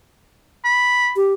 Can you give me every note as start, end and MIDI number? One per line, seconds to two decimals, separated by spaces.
0.64 1.13 83
1.16 1.33 67